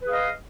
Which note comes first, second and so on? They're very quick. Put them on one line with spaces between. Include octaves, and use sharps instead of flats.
B4 G#4 F5 D#5